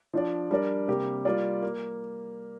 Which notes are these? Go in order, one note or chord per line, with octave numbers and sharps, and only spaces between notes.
F3 D4 F4 D5
G3 D4 A#4 D5
C3 G3 A#3 G4 A#4
G3 A#3 F4 D5
A#3